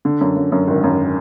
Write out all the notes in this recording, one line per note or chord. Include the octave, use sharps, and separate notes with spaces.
D3
F#2
F#2
F#2
G#1
F#2